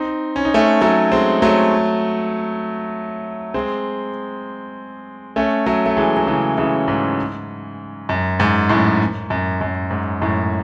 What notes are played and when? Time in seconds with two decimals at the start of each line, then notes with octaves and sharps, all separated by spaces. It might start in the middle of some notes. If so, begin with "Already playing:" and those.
Already playing: C4 D#4
0.36 C#4
0.45 D#4
0.54 A3 C#4
0.81 F#3 A3
1.12 G#3 C4
1.42 F#3 A3
3.54 G#3 C4
5.36 A3 C#4
5.66 F#3 A3
5.86 A3
5.97 E3 G#3
6.17 F#3
6.27 C#3 E3
6.57 C#3 E3
6.88 G#2
8.09 F#2
8.40 G#2
8.69 F#2 A2
9.30 F#2
9.61 F#2
9.91 G#2
10.22 F#2 A2